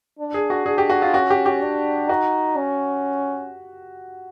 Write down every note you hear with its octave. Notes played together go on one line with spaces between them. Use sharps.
D4
G#4
F#4
D4 G#4
G4
F#4
F4
C#4 F#4
G4
G4
D4
D#4 F#4
C#4